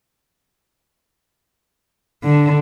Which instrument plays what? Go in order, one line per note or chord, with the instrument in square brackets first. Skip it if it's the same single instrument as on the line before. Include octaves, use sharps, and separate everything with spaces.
[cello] D3